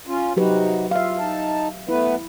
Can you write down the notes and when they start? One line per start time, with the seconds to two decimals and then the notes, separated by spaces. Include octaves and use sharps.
0.07 C#4 F4
0.37 C3 F#3 D#4 F#4 G4 B4
0.91 F4 E5 F5
1.19 D#4 A5
1.89 A3 B3 E4 B4